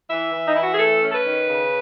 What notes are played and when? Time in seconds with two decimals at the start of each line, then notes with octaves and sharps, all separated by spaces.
0.10 E3 E5
0.33 E3
0.47 D#4
0.55 E3 E4
0.63 F#4
0.71 G#4
0.79 A3 A4
1.03 C#4
1.10 A4
1.15 B4
1.25 D#3
1.49 C#3